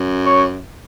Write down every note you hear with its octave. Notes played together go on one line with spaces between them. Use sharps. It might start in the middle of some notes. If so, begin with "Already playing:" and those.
Already playing: F#2
C#5